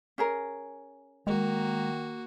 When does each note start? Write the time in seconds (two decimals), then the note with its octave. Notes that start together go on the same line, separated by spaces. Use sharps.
0.18 C#4 G#4 A#4
1.27 D#3 G#3 A#3 F#4